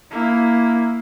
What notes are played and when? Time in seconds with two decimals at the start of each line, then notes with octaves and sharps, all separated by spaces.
0.11 A#3 E4